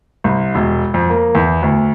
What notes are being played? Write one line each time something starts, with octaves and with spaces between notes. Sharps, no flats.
C2
E1
F2
A#3
E2
D2